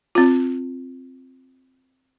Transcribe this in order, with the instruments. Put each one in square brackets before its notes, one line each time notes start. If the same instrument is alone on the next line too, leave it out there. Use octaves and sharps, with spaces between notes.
[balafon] C4 F4